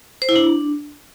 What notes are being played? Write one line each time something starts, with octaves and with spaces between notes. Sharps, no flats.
C5
E4
D4